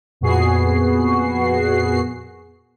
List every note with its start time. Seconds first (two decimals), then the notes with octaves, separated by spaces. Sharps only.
0.21 F2 A#2 B3 F#4 G#4 C7